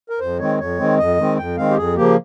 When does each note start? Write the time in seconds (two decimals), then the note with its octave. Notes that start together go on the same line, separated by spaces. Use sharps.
0.10 A#4
0.20 F2 C5
0.39 D#3 G#3 C4 C#5
0.59 F2 C#5
0.79 D#3 G#3 C4
0.98 F2 D#5
1.18 D#3 G#3 C4
1.38 F2 G5
1.57 D#3 G#3 C4 F5
1.71 G4
1.77 F2 G#4
1.97 C#3 F3 A#3 G4